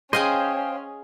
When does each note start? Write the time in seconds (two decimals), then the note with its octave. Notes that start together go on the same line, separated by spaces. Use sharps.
0.13 C#4 G#4 C5 D#5 F5 G5 G#5 C6